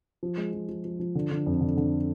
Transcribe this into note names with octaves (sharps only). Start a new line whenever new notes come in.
F3
G#3
F3
F3
F3
F3
D3
D3
F2
D3
D3